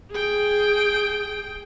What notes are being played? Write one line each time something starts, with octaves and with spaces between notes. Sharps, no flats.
G#4 G5